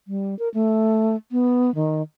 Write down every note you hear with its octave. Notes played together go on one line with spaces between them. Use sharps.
G3
A#4
A3
B3
D#3